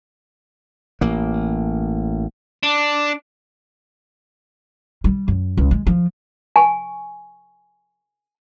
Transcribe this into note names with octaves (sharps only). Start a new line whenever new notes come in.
A1 A#3
D4
G3
F#2
C#2
G#3
F3
G#5 C#6